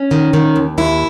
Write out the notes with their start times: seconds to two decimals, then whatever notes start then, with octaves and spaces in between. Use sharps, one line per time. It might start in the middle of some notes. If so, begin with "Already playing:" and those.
Already playing: C#4
0.11 D#3
0.33 D#3
0.56 D#2
0.78 D#2 E4